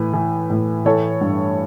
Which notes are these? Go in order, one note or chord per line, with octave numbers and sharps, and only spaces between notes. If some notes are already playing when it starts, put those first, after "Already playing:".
Already playing: A2 E3 B4
E3
A2
E3 A4 C#5
G2